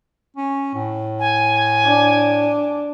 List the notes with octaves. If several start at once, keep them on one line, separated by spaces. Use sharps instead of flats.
C#4
A2
G#5
D4